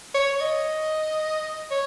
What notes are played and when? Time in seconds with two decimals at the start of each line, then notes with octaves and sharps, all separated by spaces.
0.15 C#5
0.41 D#5
1.71 C#5